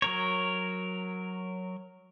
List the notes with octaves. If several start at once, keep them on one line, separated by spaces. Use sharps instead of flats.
F#3 A#4 C#5